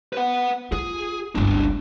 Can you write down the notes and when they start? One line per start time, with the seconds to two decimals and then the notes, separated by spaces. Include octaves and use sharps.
0.13 B4 F#5
0.72 F4 G#4
1.35 G1 C#2 C4 D4